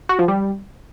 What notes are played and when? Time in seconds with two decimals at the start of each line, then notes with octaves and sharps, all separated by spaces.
0.09 F#4
0.19 F3
0.28 G3